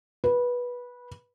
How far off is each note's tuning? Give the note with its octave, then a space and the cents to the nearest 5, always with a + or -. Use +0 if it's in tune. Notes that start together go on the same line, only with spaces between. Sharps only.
B4 -15